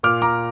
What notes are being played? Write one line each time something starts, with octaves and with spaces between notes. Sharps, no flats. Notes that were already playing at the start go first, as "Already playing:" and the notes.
A#2 D6 F6
A#5 D6